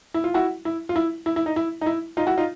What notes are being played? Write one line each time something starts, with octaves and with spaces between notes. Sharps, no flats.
E4
F4
E4 F#4
E4
F4
E4
E4
E4
D#4
E4
D#4
E4
D#4 F4
E4 F#4
D#4 F4